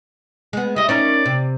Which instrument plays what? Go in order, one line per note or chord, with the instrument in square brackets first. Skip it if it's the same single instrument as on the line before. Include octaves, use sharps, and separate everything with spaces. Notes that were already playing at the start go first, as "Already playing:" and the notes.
[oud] G#3 B3
[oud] G3 E4 [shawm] D#5
[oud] C#4 D#4 A#4 [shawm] D5
[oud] C3